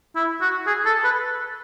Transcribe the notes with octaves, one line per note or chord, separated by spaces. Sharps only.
E4
F#4
G#4
A4
B4